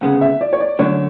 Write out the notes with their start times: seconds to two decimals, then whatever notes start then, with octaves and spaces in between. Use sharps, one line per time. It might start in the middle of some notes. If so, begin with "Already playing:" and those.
0.01 D2 C#3 G#3 B3 F#5
0.21 E5
0.41 D5
0.53 C#5
0.60 D5
0.79 F#2 D3 A3 D4 C#5